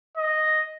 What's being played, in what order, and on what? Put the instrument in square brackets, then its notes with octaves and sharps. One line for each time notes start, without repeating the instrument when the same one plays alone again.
[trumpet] D#5